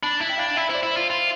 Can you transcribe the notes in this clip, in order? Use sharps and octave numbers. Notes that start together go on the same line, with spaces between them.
D4 B5
E4
G5
D4 F5
G5
E4 E5
E4 C5
D5
E4
F4 C5
F4